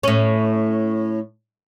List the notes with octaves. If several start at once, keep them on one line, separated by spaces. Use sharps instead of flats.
A2 C#4